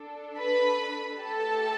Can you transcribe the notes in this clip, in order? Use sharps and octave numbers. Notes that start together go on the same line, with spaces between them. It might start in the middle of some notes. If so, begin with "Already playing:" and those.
Already playing: D4 A4
B4 B5
A3 G4 A4 A5